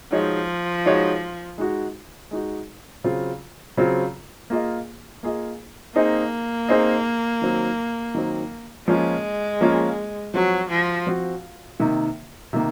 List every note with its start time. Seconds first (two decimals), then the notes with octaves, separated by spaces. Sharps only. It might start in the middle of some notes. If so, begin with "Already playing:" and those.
0.12 F3 G#3 D#4 F#4 C#5
0.85 G#3 D#4 F#4 C#5
1.58 G#3 D#4 F#4
2.31 G#3 D#4 F#4
3.04 C#3 F#3 C4 F4
3.77 C#3 F#3 C4 F4
4.50 A#3 F4 G#4 D#5
5.23 A#3 F4 G#4 D#5
5.95 A#3 C4 D#4 G#4 C5 D#5
6.69 C4 D#4 G#4 C5 D#5
7.42 D#3 F#3 C4
8.15 D#3 F#3 C4
8.87 F3 G#3 A#3 C#4 F4
9.61 F3 A#3 C#4 F4
10.34 F3 F#3 C4 F#4
10.70 F3
11.07 F3 C4 F#4
11.80 C3 D#3 A#3
12.53 C3 D#3 A#3